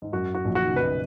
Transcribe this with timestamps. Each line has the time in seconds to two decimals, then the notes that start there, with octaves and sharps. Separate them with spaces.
0.02 G#2
0.13 F#2 F#4
0.35 F#4
0.45 A#1 A#2
0.55 F#4
0.61 D#3
0.70 C#3
0.76 B1 B2 B4